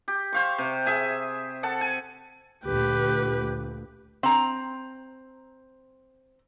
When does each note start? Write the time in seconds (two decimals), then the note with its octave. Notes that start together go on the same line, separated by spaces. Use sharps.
0.08 G4
0.33 C5 F5 C#6
0.58 C3
0.86 G#4 E5 G#5
1.63 A4 F#5 A5
1.81 G#5
2.66 D2 A#2 G4 B4
4.23 C4 A#5